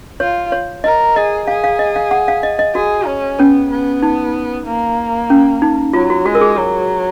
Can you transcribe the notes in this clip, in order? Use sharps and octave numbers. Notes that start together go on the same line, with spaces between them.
F4 C#5
C#5
A#4 D#5
G#4 D#5
G#4 F5
F5
D#5
F5
F#5
F5
D#5
D#5
F#4 G#4
C#4
B3 C#4
B3
D#4
A#3
C#4
D#4
F#3 F4
F#4
G#3 F#4
A#4
G#4
F#3